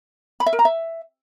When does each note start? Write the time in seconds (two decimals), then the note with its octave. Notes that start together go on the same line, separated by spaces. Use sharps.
0.40 B5
0.46 E5
0.53 A#4
0.59 A#5
0.65 E5